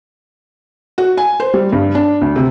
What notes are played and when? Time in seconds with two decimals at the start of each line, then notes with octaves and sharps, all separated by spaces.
0.98 F#4
1.17 G#5
1.40 C5
1.54 G3
1.72 G2
1.95 D4
2.21 D2
2.36 C3